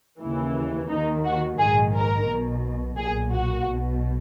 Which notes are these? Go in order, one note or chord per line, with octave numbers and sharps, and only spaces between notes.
D#2 C#3 E3
D#2 D#3 D#4
F#4
A#1 G#2 D#3 G#4
A#4
B1 B2
B1 A#2 G#4
F#4
B1 B2